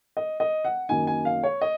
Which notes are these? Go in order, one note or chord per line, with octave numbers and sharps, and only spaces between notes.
D#5
D#5
F#5
F#2 D#3 A#3 D#4 G#5
G#5
F5
C#5
D#5